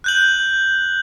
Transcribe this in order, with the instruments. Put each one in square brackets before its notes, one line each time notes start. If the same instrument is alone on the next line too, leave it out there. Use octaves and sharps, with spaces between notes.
[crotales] F#6 G6 F#7